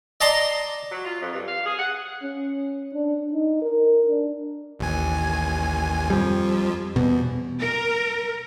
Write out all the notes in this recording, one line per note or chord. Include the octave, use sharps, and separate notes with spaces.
D5 D#5 A5 A#5 C6 D#6
F#3
F4
F2
G2
F5
G#4
F#5
C#4
D4
D#4
A#4
D4
A1 D#2 G#5
F2 F3 G3
E2 B2
A#4